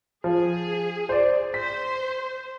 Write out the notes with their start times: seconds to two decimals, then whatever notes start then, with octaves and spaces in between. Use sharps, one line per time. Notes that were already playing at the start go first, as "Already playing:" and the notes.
0.24 F3 G#4
1.09 C5 D5
1.54 C5 B6